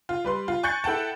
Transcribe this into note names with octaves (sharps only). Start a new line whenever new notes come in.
F4
G3 B4 C6
F4
G#5 C#6 F#6 G6 A6 C#7
E4 A4 F#5 G5 A5